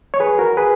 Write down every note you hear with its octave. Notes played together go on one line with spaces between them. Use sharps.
C#5
G#4 B4
F#4 A#4
G#4 B4